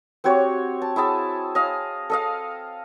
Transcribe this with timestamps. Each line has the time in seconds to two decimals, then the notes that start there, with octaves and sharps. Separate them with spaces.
0.24 C4 F#4 G4 C#5
0.82 A5
0.96 E4 G#4 E5 A5
1.55 D#5 F5
2.10 A4 D#5 F5